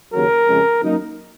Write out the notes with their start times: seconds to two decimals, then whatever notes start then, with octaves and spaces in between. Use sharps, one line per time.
0.12 D#2 C#3 F#3 A#4
0.48 F2 C#3 G#3 C#4
0.82 F#2 D#3 A#3 D#4